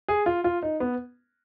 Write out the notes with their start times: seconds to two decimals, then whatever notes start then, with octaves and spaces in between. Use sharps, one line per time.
0.08 G#4
0.26 F4
0.44 F4
0.63 D#4
0.80 B3